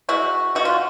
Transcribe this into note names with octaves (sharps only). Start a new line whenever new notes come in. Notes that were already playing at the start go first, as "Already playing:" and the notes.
G#3 E4 F#4
B2 F#4
F4